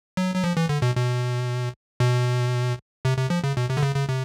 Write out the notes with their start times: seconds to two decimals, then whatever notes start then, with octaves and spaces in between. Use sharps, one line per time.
0.17 F#3
0.35 F#3
0.44 F3
0.57 E3
0.69 D3
0.82 B2
0.96 B2
2.00 B2
3.05 C3
3.18 C3
3.30 F3
3.44 C#3
3.57 B2
3.70 C3
3.77 D3
3.83 C#3
3.96 C#3
4.09 C3